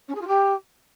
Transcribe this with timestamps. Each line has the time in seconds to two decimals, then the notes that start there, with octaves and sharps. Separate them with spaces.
0.08 C#4
0.14 G#4
0.21 F4
0.27 G4